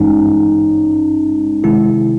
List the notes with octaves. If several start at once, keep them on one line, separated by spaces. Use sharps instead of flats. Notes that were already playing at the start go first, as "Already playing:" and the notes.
Already playing: G#1 G2 E3 G#3 C#4 D#4
C3 D#3 G#3 E4